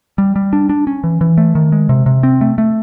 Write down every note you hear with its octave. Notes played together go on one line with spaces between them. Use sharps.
G3
G3
D4
D4
C#4
E3
E3
A3
D#3
G#3
C3
C3
C4
A3
A3